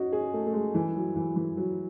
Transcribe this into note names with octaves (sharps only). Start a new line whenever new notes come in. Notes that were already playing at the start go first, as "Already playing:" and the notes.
Already playing: C#4 D#4 F#4
G#4
A3
A3
G#3
E3
F#3
E3
E3
F#3